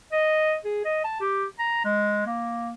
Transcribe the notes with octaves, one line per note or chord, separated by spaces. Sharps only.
D#5
G#4
D#5
A5
G4
A#5
G#3
A#3